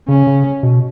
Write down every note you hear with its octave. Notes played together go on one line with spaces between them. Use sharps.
C#3 C#4
C#3
B2